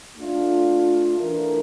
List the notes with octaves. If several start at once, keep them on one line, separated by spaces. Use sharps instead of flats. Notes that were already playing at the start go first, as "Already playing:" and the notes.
A3 D4 F4
E3 A3 D4 F4 A#4